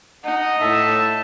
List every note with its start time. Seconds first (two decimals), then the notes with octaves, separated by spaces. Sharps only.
0.24 D#4 D#5 F#5
0.61 A2 E5 A5